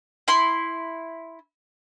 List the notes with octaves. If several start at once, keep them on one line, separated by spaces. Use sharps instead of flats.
E4 C6